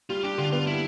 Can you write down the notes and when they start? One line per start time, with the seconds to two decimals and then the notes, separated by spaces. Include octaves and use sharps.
0.09 G3 F4
0.23 D4 G4
0.38 D3 F4
0.52 B3 F4
0.66 G3 E4